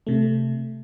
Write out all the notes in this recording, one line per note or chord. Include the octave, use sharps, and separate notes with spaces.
C3 A3